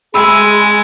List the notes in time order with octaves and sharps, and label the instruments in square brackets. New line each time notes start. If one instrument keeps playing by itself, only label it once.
[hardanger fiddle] G#3 [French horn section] G#4 [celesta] B5 E6